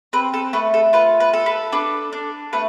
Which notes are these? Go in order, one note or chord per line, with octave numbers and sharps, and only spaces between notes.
C4 B4
A4
A3 B4
A4
F4 B4
B4
A4
B4
D4 B4
D4
A3 B4